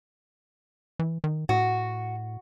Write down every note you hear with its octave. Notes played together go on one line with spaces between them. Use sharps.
E3
D#3
A2 F#4